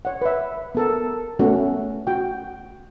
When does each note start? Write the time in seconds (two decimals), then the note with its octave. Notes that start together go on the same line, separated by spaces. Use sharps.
0.05 C#5 F#5
0.22 B4 E5
0.75 B3 A4 A#4
1.39 A3 B3 C#4 F#4
2.07 F#4 G5